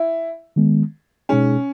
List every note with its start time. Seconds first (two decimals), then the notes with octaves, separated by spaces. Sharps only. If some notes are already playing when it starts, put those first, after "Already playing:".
Already playing: E4
0.56 D#3 G#3 B3
1.29 B2 G#3 C#4 D#4 G#4